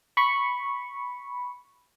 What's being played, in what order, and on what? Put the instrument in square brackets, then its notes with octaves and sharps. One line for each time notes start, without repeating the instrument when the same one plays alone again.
[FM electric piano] B5 C#6